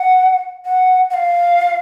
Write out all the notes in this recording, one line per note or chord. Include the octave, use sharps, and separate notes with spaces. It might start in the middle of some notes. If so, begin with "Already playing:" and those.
Already playing: F#5
F#5
F#5
F5